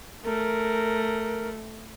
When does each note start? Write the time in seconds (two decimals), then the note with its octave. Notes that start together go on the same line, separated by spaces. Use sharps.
0.24 A3 A#4